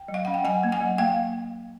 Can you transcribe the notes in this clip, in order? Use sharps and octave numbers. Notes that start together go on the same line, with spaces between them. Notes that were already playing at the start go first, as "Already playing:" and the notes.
Already playing: G5
F#3
F5
C#4 F#5
G5
F#3 F#5 G#5
A#3
F#5 G#5
F#3
A#3 F5 G5